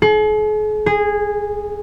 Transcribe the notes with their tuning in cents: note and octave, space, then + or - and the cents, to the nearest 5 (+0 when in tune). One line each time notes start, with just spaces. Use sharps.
G#4 +45
G#4 -15